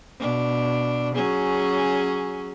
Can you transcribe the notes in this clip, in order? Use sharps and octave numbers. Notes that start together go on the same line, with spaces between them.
B2 D4
F#3 C#4 G#4